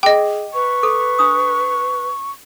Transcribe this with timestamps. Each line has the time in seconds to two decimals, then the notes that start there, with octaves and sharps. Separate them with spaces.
0.03 G#4 D#5 G5 D6
0.54 B4 C#6
0.83 A4 D6
1.19 D4 D#6